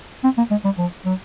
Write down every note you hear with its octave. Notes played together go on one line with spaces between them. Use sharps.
C4
A#3
G#3
G3
F3
F#3